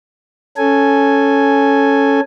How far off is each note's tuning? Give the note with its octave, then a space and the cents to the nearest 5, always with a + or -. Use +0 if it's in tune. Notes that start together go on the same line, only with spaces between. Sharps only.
C#4 +0 A4 +0 G#5 +0